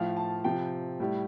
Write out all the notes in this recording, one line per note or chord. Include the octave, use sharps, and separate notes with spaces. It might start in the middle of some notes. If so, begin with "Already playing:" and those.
Already playing: A2 F3 F5
A5
C3 F3 G5
A2 G3